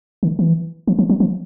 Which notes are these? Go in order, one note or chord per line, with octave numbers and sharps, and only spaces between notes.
D#3
E3
F3
F3
F#3
F3